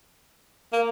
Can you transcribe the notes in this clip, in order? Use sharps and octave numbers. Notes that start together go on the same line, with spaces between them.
A#3